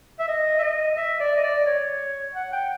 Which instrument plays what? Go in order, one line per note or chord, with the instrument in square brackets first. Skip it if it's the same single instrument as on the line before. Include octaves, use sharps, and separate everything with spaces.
[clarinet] E5
D#5
E5
D#5
E5
D5
D#5
D5
C#5
F#5
G5